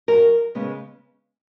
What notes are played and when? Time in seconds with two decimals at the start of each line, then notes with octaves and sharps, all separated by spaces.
0.08 F#2 A#4
0.55 C#3 G#3 B3